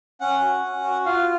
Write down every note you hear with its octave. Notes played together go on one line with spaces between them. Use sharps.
C#4 F#5
F#4
C#4
F#4
F4 F5